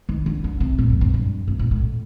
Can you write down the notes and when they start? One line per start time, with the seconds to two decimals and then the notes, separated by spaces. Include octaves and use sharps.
0.09 D#3
0.26 D3
0.44 D3
0.60 C3
0.78 A#2
0.90 F2
1.01 G2
1.14 G2
1.47 C3
1.59 A#2
1.71 A2